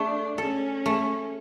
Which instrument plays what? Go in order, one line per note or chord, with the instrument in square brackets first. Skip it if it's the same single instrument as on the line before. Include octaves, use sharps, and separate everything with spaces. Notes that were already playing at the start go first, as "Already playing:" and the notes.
Already playing: [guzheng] A3 [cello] D4
[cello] C#4 [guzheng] A4
[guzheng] A3